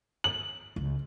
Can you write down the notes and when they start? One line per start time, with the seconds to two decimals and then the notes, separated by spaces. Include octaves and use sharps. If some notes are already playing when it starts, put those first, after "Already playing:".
0.24 F#7
0.76 C#2